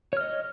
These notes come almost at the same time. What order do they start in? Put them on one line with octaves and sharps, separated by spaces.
C#5 F6 D#5